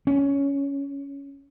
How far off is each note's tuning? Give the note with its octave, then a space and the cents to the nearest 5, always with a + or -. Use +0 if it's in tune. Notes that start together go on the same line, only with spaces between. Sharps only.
C#4 +10